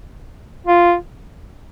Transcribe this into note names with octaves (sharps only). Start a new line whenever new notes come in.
F4